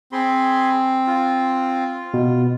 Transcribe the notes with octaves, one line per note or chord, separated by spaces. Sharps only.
C4 G#4 B5 C6
F4
B2